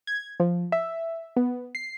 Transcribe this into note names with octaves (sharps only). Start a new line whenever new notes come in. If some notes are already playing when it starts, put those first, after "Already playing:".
G#6
F3
E5
B3
C7